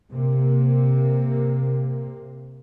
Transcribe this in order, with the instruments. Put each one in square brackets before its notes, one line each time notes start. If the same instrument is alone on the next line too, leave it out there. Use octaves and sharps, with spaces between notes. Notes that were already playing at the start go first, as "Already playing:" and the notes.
[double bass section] C3 A#3